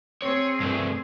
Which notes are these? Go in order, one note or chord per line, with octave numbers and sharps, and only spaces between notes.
C4 G#4 C#5
G2 A3